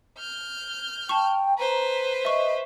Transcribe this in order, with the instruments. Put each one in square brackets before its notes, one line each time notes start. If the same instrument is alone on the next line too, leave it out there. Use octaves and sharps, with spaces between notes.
[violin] F6 G6
[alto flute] G5 [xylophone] A5 C#6
[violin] B4 C5 [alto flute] A#5
[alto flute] D#5 [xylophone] E5 C#6